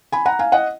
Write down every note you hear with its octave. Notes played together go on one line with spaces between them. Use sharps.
G#5 B5
F#5 A#5
F5 G#5
D#5 F#5